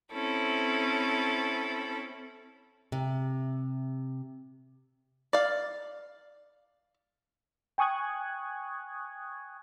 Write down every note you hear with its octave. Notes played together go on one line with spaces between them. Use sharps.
C4 C#4 E4 A4
C3
D5 F5
G5 G#5 C#6 D#6 F#6 G#6